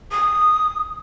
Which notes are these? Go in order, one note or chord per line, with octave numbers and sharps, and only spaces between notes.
D#6